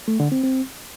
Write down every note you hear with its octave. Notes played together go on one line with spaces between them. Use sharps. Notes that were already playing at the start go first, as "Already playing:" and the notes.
A3
D3
C4
C4